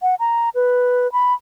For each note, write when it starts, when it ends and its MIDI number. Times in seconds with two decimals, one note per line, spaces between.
0.02 0.15 78
0.20 0.49 82
0.55 1.11 71
1.12 1.34 83